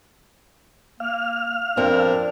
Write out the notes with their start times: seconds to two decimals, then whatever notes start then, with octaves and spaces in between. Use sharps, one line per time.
1.00 A#3 F5 F6
1.77 F2 C4 D4 A#4